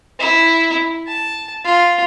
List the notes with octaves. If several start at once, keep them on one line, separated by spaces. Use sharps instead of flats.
E4
A5
F4